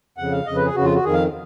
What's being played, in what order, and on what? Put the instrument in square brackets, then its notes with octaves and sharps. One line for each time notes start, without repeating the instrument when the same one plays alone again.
[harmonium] F2 C#3 F#5
F5
F2 C#3 D#5
B4
G#4
F2 C#3 F#4
F4
F#4
F2 D#3 G#4
F5